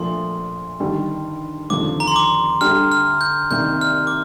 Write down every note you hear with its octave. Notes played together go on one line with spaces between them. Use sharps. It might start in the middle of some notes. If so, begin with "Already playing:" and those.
Already playing: A#1 A#2 F3 A3 C6
G1 G2 D#3 G3 D4
F1 D#2 D3 F3 D6
A#5
C6
D6
D2 D3 G3 D4 F6
F6
G6
C2 C3 D#3 A#3 G6
F6
D6